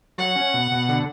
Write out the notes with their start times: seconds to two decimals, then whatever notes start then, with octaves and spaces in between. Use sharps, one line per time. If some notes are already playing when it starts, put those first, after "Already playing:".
0.18 F#3 F#5
0.36 C#4
0.54 B2
0.71 B2
0.89 D3